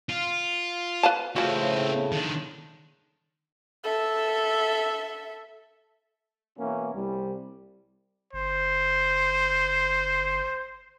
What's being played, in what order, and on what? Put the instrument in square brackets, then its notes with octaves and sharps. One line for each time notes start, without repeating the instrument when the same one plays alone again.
[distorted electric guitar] F4
[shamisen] B4 F5 A5
[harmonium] A2 C#3 A3 [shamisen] F3 F#4 [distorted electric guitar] C4 B4
[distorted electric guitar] D#3 D4
[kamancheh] A4 E5
[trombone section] B2 E3 A#3 C#4 E4 F#4
C2 G3
[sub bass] G1 [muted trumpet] C5